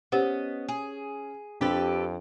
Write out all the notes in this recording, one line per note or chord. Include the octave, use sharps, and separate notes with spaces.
B3 C#4 G4 C5 D#5 F#5
G#4
F2 C4 D4 G4 A4 B4